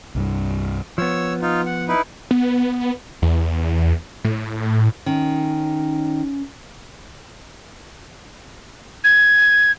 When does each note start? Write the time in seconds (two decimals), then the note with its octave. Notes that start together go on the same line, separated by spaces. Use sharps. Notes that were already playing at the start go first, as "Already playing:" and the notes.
0.15 C2 G2 G3
0.98 F3 B3 C#5 E6
1.42 D#4 F4
1.66 F#5
1.88 D#4 E4 B4
2.31 B3
3.22 E2
4.24 A2
5.06 D#3 C#4
9.04 G#6